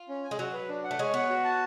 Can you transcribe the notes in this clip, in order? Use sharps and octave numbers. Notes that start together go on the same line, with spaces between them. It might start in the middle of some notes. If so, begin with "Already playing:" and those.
Already playing: F4
C#4
G#5
G#3
F#3 F#4
B4
D4
F#5
A3
G#3 C#5
B3 F#5
F#4
A5